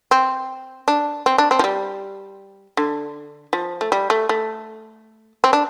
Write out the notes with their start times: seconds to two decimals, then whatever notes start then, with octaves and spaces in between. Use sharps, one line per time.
0.11 C4
0.88 D4
1.26 C4
1.38 D4
1.51 C4
1.59 F3
1.64 G3
2.77 D3
3.53 F3
3.81 A3
3.92 G3
4.10 A3
4.29 A3
5.44 C4
5.53 D4